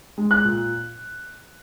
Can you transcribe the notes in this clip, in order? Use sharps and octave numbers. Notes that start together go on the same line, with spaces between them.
G#3
F#6
A#2